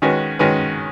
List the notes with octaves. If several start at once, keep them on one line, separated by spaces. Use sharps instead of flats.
D#3 G#3 C#4 F#4 B4
D#3 G#3 C#4 F#4 B4